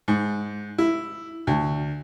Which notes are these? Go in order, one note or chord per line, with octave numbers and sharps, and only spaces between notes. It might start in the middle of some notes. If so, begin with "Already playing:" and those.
G#2
E4
D2